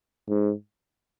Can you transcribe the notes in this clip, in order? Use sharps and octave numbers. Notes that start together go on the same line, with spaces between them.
G#2